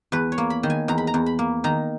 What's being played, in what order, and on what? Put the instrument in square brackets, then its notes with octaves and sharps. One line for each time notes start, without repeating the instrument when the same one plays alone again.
[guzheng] E2 B4
C#5
A#3
B5
D#3
G#5
E2 A#5
B5
A#5
E2
B5
A#3
D#3 A#5